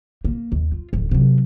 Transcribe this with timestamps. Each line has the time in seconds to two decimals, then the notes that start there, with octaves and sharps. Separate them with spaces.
0.25 A#3
0.52 D#2
0.72 F4
0.93 D1 F2
1.11 C3 F#3